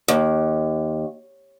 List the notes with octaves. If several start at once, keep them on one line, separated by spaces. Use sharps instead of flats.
D#2